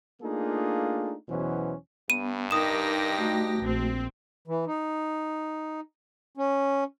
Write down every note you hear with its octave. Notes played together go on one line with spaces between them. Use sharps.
A3 A#3 D4 D#4 F4 G#4
E2 B2 E3 F#3 C#4 C5
G2 B3 D#7
D#4 G4 A#4 D#6 A#6 E7
A3 F#4
A#1 C4
E3
D#4
C#4